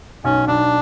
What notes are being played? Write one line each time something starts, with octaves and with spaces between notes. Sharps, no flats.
B1 C#4
B1 D4